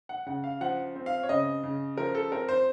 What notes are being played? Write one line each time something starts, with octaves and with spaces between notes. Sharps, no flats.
F#5
C#3 F#5
F5
F3 F#5
C4
F5
C#5
C#3 D#5
C#3
F3 A#4
A4
C4 A#4
C5